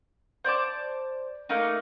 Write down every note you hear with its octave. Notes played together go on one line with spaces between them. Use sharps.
C5 D5 A5 D6
A3 A#3 D#4